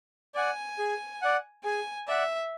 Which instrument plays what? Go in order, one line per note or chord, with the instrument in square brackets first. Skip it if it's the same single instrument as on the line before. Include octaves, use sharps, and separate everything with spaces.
[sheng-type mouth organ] D5 F#5 [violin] G#5
[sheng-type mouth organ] G#4
D5 F#5
[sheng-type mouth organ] G#4 [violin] G#5
[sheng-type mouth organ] D5 F#5 [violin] E5